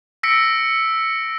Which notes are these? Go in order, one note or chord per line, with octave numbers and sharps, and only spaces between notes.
E6 A#6 B6 C#7 D7